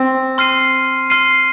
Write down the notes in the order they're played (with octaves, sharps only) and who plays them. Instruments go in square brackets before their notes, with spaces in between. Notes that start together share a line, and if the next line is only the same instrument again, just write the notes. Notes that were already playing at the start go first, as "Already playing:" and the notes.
Already playing: [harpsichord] C4
[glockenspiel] C6 F6 C7 D#7
C6 F6 C7 D#7